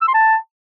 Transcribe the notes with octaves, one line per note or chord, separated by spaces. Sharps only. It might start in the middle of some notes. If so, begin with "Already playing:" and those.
E6
C6
A5